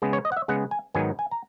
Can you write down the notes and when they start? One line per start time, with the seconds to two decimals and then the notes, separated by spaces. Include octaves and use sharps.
0.02 C#3 G#3 B3
0.13 C#5
0.25 D#5
0.32 F#5
0.37 E5
0.48 C#3 G#3 B3 F#5
0.71 G#5
0.94 G#2 D#3 F#3 B3 G#5
1.19 G#5
1.31 A#5